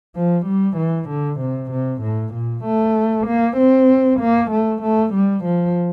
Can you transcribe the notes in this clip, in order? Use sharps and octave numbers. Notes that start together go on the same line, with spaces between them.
F3
G3
E3
D3
C3
C3
A2
A#2
A3
A#3
C4
A#3
A3
A3
G3
F3